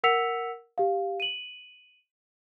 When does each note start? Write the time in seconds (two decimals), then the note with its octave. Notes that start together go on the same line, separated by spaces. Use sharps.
0.04 A#4 F#5 E6 B6 C#7 F7
0.78 G4 F5
1.20 D#7 F#7